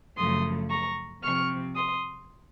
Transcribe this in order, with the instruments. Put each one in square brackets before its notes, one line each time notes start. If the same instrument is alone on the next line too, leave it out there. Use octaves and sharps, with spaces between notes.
[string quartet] F#2 C#3 F3 A3 C6 D#6
A#5 C#6
C3 F3 C4 C#6 F6
C6 D#6